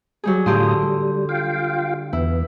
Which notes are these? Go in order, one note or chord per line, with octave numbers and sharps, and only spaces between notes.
F#3 G3 G#4
A2 D3 F4 G4 C6 D#6
G3
F4 F5 G5
E2 B3 E4